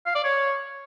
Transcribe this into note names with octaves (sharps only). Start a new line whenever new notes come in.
F5
D5
C#5